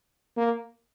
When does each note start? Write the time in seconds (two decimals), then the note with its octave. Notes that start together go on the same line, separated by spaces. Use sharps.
0.37 A#3